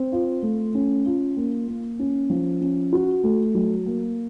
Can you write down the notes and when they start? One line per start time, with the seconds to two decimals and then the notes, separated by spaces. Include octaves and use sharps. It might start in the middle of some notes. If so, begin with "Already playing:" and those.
Already playing: C4
0.12 F4
0.43 A3
0.75 C#4
1.06 F4
1.37 A#3
1.68 A#3
1.99 C#4
2.30 F3
2.61 C#4
2.93 F#4
3.24 A3
3.55 F#3
3.86 A#3